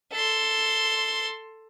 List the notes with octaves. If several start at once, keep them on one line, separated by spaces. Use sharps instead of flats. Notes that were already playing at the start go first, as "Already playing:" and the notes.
A4 C6